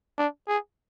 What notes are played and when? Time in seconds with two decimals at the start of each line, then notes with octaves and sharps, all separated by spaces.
0.18 D4
0.48 G#4